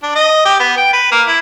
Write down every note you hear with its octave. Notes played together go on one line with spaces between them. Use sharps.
D4
D#5
G4
B3
G5
B4
A#3
E4